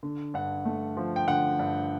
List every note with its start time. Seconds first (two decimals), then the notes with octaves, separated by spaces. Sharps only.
0.03 D3
0.34 G2 F#5
0.65 A3
0.97 F3
1.16 G5
1.27 D3 F#5
1.59 G2